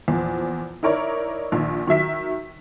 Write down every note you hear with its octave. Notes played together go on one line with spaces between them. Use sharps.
E2 A#2 F3
D#4 E4 A#4 C#5 D5
A#1 D#3
D#3 F#3 E5 B6